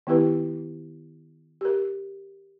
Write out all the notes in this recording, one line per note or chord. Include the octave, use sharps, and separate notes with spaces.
D#3 B3 E4 G4 B4
G4 A#4